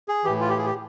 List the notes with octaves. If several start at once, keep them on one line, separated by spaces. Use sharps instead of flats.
G#4
A2 E3 G4
F4
G4
G#4
G4